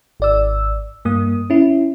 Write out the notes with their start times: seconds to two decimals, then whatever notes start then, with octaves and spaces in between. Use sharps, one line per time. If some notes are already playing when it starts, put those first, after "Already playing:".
0.20 G#1 D5 E6
1.05 G2 A#3 D#6
1.50 C#4 E4